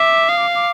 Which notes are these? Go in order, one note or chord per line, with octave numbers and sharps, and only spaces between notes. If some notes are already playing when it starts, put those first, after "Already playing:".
Already playing: E5 D6
F5 D#6
D6
D6